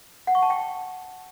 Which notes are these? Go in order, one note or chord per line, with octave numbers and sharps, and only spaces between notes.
F#5
C#6
A5
G5